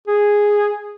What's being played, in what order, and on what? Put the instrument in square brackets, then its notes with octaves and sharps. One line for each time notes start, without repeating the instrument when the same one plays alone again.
[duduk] G#4